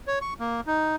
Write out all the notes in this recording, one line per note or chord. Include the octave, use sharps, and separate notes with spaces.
C#5
C#6
A#3
D#4